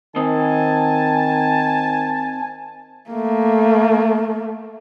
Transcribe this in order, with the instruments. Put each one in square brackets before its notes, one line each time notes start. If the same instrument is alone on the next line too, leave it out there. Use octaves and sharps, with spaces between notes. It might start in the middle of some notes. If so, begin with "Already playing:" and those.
[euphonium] D#3 [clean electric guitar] C4 D#5 [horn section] G#5 A5
[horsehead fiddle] A3 A#3